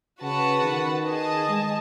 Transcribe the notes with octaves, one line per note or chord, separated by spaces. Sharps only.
C#3 F#4 B4 F#5 A5
D#3
G#4 D#5 A5
G#3